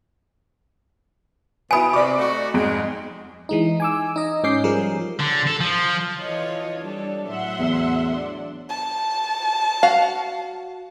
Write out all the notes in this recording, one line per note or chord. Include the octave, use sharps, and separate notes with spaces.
B2 E4 G#5 B5 D#6 D7
C3 D5 C#6 D6
A3 D#4 F#4
F2 G#2 G#3 D7
E3 G#3 D#4
G#5 D6 E6
D#4 D#5
G#2 C#4 D6 G6 C7
F3 G3 G#4 A#4
D3
A4
F3
E3 F4 A4 C#5 D#5
G3 D4 A4
A2 F#3 E5 F#5 C6
E2
D4
A5
F#4 F5